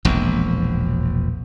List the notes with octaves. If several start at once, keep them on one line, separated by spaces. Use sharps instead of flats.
E1 A#1 F2